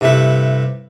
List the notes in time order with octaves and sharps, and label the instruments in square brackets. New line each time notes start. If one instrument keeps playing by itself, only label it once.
[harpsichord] G2 C3 A3 E4 B4